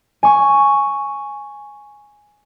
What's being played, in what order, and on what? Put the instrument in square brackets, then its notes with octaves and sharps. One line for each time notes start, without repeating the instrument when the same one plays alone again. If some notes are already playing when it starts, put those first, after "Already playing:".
[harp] G#5 C#6